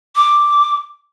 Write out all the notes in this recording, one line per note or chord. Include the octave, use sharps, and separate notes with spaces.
D6